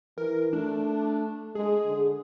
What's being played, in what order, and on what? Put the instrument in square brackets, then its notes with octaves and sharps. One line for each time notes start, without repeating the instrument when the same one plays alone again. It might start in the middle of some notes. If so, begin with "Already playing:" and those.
[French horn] E3 [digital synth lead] A#4
[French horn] A3 [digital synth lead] D4
[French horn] G#3 [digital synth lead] G#4
[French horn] D3